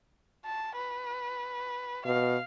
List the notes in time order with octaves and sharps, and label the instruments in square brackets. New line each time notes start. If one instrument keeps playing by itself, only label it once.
[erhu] A5
B4
[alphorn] B2 [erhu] F5